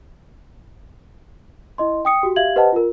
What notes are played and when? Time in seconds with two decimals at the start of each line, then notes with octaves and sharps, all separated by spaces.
1.78 E4 D#5 C6
2.05 G5 D#6 C#7
2.23 F#4 G4
2.36 G4 E5 F5 G#6 F#7
2.56 G4 B4 C5 D#5 F#5 A5
2.73 F4 A#4